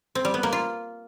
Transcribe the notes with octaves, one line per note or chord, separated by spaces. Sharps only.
C4
G3
B3
A#3
F4